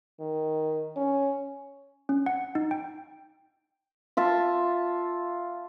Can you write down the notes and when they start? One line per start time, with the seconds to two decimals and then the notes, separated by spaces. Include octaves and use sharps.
0.20 D#3
0.96 C#4
2.09 C#4
2.26 F#5
2.55 D#4
2.71 G5
4.17 F4 E5 A5